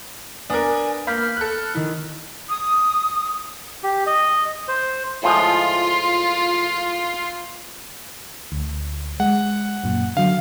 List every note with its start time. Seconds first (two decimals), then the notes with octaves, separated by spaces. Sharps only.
0.50 B3 D4 A#4 G#5 D#6
1.07 A#3 B5 F6 G6 B6
1.37 A4 F#6
1.75 D#3 E4
2.49 D#6
3.83 G4
4.07 D#5
4.68 C5
5.23 A2 F3 G#3 F4
8.52 D2
9.20 G#3 F#5
9.84 F#2 A#2
10.17 D3 F#3 F5